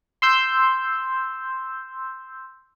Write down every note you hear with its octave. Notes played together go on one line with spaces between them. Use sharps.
C6 E6 G6